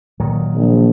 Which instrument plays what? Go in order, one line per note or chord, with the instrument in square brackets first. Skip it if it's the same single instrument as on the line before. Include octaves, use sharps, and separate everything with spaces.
[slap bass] A#2 D#3 F#3
[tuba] A#1